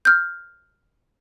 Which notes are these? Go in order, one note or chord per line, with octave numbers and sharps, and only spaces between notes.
F6 G6